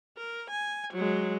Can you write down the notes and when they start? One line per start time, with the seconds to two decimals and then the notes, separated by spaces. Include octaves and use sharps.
0.17 A#4
0.50 G#5
0.94 F#3 G#3